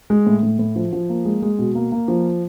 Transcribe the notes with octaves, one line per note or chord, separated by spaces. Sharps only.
G#3
A2
A2
A2
F3
F3
A#3
G#3
G#3
B2
A#3
A#3
F3